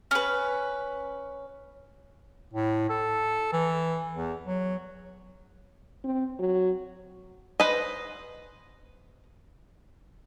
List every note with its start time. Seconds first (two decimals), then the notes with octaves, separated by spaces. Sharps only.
0.11 C#4 B4
2.53 A2
2.89 A4
3.52 E3
4.14 E2
4.44 F#3
6.04 C4
6.39 F#3
7.60 B4 C5 D#5